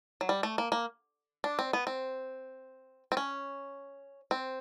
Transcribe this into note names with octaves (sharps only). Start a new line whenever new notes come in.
F#3
G3
A3
A#3
A#3
D4
C4
B3
C4
C4
C#4
C4